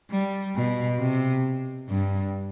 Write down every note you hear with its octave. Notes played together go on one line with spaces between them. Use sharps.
G3
B2
C3
G2